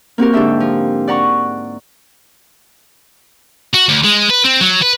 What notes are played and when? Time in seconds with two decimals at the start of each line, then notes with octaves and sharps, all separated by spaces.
0.18 A#3 C4 F#4 G4 A#4
0.33 G#2 D3 D4 G4 E5 G5
0.60 F3
1.08 D5 F#5 A#5 C#6
3.74 F#4
3.89 D2
4.04 G#3
4.30 B4
4.45 C4
4.61 F#3
4.82 B4